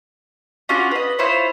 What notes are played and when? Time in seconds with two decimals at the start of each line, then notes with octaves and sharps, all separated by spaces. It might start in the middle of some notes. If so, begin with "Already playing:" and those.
0.69 C#4 D4 F4 F#4
0.91 B4 D#5
1.19 E4 F4 C5 C#5